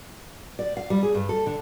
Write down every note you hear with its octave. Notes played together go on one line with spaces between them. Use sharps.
D5
F5
G3
G#4
G2
A4
D3